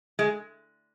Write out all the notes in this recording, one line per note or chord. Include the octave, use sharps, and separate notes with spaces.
G#3